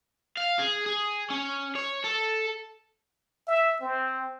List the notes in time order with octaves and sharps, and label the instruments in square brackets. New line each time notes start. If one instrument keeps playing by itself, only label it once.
[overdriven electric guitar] F5
G#4
G#4
C#4
C#5
A4
[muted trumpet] E5
C4